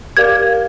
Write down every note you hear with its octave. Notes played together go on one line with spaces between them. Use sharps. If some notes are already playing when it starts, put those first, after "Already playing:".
G4 A#4 D5 F5 G#6